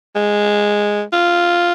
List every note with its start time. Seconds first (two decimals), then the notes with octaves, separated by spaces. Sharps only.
0.16 G#3
1.13 F4